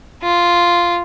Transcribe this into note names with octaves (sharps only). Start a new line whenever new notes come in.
F4